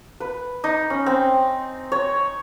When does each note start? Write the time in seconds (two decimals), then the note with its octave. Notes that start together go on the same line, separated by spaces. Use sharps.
0.20 B4
0.64 D#4
0.90 C#4
1.06 C4
1.92 C#5